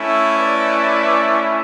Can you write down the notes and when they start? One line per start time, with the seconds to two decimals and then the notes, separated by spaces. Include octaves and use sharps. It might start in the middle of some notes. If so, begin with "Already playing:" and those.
Already playing: A3 C#4 E4
0.36 B4 D5